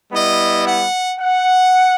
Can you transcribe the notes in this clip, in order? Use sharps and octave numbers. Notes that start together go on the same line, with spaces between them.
G3 B3 E4 D#5
F#5
F#5